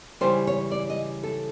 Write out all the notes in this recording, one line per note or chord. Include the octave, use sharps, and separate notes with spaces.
C#3 E3 G3 C5
C#5
D5
D#5
A4